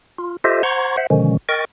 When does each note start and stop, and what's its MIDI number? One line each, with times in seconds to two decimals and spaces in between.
0.18 0.37 65
0.44 0.63 65
0.44 0.63 67
0.44 0.63 69
0.44 0.63 72
0.44 0.63 75
0.44 0.63 76
0.63 0.97 72
0.63 0.97 78
0.63 0.97 82
0.63 0.97 84
0.63 0.97 85
0.63 0.97 92
0.97 1.07 72
0.97 1.07 76
0.97 1.07 78
1.10 1.37 47
1.10 1.37 50
1.10 1.37 51
1.10 1.37 53
1.10 1.37 56
1.10 1.37 61
1.49 1.65 70
1.49 1.65 75
1.49 1.65 79
1.49 1.65 85
1.49 1.65 93